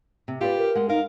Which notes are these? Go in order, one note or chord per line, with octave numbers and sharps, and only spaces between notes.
C3
F4 G4 B4 D5
A#4
G#3 F#5
D#4 A#4 F5